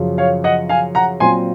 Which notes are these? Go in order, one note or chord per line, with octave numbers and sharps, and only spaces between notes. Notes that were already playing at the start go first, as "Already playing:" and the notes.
Already playing: F#2 C#3 F3
C#5 F5
D#5 F#5
F5 G#5
F#5 A#5
A#2 F#3 C4 F4 G#5 C6